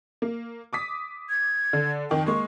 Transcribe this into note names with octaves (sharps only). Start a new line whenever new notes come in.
A#3
D6 D#6 B6
G#6
D3
F2 D#3 G5
G#3 A#3 C#6